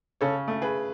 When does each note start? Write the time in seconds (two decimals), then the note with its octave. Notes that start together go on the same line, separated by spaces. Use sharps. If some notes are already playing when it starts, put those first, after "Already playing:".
0.21 C#3 A4 C#5
0.48 A3
0.62 G#4 B4